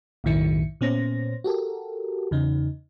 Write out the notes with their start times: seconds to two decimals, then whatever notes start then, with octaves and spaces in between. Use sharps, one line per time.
0.24 B1 F#2 A2 D#3 E4 C#7
0.81 A#2 B3 C#4 C5 A#6
1.44 F#4 G4 A4 A#4
2.31 E2 C#3 D#4